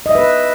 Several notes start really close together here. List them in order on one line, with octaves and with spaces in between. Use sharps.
D#5 E5 B4